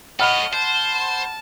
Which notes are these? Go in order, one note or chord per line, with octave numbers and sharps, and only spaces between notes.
A4 C#5 D#5 F#5 B5 F6
C5 A5